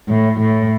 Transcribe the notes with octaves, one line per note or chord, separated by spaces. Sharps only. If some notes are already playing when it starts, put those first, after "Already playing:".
A2
A2